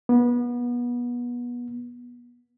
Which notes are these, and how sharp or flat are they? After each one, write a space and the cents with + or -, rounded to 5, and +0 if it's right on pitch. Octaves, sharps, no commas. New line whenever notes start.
B3 -25